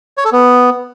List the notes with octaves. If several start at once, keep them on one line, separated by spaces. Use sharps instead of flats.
C#5
A4
B3